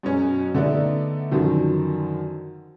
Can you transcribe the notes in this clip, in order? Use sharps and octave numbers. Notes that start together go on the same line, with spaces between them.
F#2 B2 F#3 C#4
D3 A3 B3 D4 D#4
F#2 D3 D#3 F3